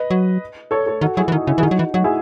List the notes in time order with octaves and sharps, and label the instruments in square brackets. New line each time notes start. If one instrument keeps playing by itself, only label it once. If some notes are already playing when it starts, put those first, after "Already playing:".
Already playing: [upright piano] B4 D#5
[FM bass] F#3
[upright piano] A4 C#5
A4 C#5
[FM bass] D#3 [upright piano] F#4 A4
[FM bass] F#3 [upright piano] E4 G#4
[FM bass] E3
[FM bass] D#3 [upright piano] D#4 F#4
[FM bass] C#3 [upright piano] E4
[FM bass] E3 [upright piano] G#4
[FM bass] D#3 [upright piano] D#4 F#4
[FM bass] F#3
E3
[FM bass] F#3 [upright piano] D#4 F#4
[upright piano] E4 G#4